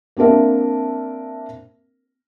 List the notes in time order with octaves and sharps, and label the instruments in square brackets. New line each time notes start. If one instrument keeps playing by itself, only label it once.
[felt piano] A#3 C4 D4 A#4 E5